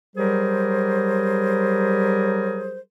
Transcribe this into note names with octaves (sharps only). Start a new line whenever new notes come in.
F#3 G3 G4 G#4 A#4 C5